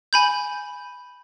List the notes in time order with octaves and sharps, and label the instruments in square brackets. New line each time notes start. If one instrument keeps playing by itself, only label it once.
[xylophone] G#5 B5 G6